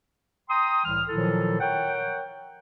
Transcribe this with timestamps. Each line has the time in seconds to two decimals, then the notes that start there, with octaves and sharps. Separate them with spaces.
0.48 G5 A#5 C6 D#6
0.85 C2 A2 E3 G3 F6
1.08 A#2 D#3 F3 F#3 E4 A4
1.60 A#4 C#5 F#5 G5